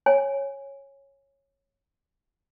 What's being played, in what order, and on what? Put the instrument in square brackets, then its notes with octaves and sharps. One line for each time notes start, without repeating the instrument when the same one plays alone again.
[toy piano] C#5 G#5